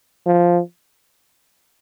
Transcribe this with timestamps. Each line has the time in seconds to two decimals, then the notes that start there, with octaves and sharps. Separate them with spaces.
0.27 F3